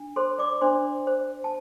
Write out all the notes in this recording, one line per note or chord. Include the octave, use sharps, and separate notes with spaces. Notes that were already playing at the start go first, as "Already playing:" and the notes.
Already playing: D4
A4 C5 C6
D5 D6
D4 C5 C6
C5
A5